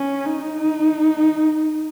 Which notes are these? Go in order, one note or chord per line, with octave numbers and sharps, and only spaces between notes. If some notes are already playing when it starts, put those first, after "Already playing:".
Already playing: C#4
D#4